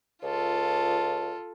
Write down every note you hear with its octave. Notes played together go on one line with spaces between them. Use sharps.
C#2 F4 A4